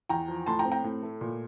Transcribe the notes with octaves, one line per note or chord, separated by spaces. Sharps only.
E2 G5 A#5
F3
A2 A5 C6
G5 A#5
C4
G5 A#5
A2
A3
A#2